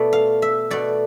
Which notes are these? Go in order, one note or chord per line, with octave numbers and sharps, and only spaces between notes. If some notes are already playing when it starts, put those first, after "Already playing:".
Already playing: B2 A3 D5
F5
E5
B2 A3 D5